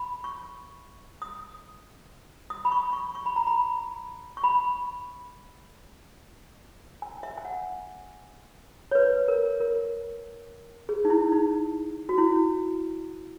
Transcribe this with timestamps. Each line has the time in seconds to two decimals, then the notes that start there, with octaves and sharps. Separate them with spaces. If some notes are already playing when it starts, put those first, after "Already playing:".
Already playing: B5
0.24 C#6
1.22 D#6
2.50 D#6
2.65 B5
2.72 C#6
2.93 C#6
3.15 C#6
3.26 B5
3.36 A#5
3.47 B5
4.37 C#6
4.44 B5
7.02 G#5
7.23 E5
7.37 G#5
7.45 F#5
8.91 C#5
8.95 B4
9.28 A#4
9.60 A#4
10.89 G#4
11.05 D#4
11.10 E4
11.32 D#4
12.09 F#4
12.18 E4